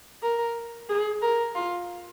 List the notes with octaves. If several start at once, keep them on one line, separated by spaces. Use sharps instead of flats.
A#4
G#4
A#4
F4